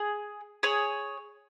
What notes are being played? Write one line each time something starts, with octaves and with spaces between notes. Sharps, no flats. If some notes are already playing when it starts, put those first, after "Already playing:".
Already playing: G#4
G#4 C#5